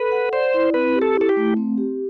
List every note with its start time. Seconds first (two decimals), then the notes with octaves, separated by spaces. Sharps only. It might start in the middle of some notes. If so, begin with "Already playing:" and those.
Already playing: A4 B4
0.12 F#5
0.33 C5 D5
0.54 E4
0.74 C4 B4
0.95 G4
1.02 A4
1.15 E4
1.21 A4
1.29 G4
1.37 A3
1.57 C4
1.78 G4